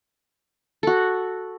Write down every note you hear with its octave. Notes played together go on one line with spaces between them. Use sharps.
F#4 A4